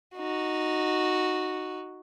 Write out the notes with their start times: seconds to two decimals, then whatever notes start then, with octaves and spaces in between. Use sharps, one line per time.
0.16 D#4 F#4